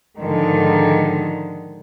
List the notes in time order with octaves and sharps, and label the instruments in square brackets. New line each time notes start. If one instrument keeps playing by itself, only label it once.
[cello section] G#2 D3 D#3 F3 G#3